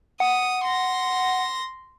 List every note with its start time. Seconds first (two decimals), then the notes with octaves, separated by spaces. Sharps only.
0.20 F#5 D#6
0.64 C6 A#6